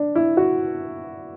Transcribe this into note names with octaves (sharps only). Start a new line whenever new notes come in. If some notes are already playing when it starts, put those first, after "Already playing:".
Already playing: D4
E4
F#4